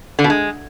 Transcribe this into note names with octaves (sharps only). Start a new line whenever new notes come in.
D3
B2
G#3